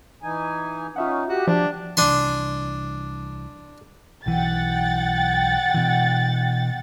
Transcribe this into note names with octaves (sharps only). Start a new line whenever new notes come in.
E3 D#4 G#5
C#4 D#4 F4 E5 F#5
F#4 G4
F3 D4
C2 E3 D4 G#5 C6
B1 E3 F#5 G5 A6
B2 E3